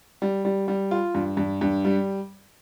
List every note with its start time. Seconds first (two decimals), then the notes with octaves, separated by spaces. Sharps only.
0.22 G3
0.45 G3
0.68 G3
0.91 F4
1.15 G2
1.37 G2
1.61 G2
1.85 G3